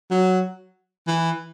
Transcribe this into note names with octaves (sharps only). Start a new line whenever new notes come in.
F#3
E3